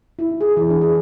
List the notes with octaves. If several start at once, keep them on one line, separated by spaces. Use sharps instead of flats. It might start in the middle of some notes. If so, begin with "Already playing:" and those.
E4
G#4
E3
D4
G#4